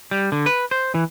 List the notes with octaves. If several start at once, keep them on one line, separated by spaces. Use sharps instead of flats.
G3
D3
B4
C5
E3